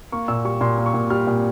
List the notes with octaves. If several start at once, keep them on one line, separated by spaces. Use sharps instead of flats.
A#3 C#6
A#2 E6
G3 C#6
A#2 C6
A#3
C#6
A#2
G3 F6
A#2